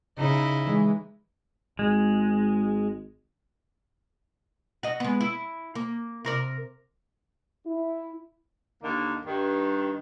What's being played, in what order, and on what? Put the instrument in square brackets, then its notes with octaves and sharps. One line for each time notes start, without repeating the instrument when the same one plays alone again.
[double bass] C#3 [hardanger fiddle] D#4 E4
[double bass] E3 G#3
[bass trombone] G#1 [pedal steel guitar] G#3
[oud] F#4 D#5
G#3 B3
E4
A#3
C3 A#4 D5
[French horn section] E4
[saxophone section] D#2 D3 D#3 A#3
G2 D#3